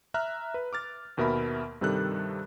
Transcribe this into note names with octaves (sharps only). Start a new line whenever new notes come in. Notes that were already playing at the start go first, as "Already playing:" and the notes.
E5 A#5 F6 F#6
B4
D6 F6 A6
D#2 B2 A#4 E5 B5
G2 C3 D#3 G3 A4 F#6